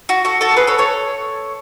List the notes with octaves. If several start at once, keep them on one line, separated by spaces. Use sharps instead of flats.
F#4
F#4 A4
F#4 A4
G#4 B4
A4 C#5
A4 C#5